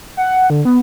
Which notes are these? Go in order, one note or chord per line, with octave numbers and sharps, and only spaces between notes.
F#5
D3
B3